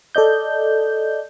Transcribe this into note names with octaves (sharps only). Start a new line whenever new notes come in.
A4 D5 D#5 G6